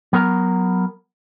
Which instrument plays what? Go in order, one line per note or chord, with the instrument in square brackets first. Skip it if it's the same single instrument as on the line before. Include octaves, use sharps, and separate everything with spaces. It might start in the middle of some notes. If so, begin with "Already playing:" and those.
[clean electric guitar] F#3 B3 A#4 A#5